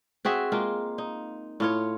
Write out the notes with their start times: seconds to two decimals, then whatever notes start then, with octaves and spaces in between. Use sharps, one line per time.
0.25 C4 F#4 G#4 E5
0.52 G#3 A#3 F4
0.98 D#4
1.60 A2 F4 C#5